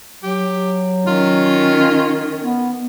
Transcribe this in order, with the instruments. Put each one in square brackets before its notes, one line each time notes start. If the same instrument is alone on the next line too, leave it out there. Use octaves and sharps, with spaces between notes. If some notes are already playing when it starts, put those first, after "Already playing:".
[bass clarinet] F#3 [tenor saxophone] G4
[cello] D#3 C#4 [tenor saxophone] F4
[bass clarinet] B3